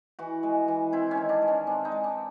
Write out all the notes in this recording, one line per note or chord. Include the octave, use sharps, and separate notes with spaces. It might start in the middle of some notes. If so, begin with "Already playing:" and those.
E3 F#4
G#3
E3
C4 E4
C#4
D#3
D4
G#3
C#4
C4 D4
D#4
G#3
D4